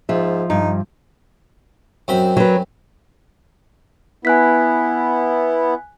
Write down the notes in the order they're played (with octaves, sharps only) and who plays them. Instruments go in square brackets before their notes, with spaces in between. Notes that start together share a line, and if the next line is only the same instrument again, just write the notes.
[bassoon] G#2 [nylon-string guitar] F3 E5
[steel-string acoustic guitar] G2 [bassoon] D#4
[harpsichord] F#2 C4 B5
[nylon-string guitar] F#3 B4
[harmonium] B3 E4 [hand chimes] G#5 F#6 B6